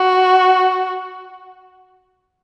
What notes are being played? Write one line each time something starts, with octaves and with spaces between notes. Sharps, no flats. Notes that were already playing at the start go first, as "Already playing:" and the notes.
Already playing: F#4